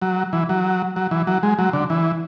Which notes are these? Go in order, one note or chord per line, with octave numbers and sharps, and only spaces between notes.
F#3
E3
F#3
F#3
E3
F#3
G#3
F#3
D3
E3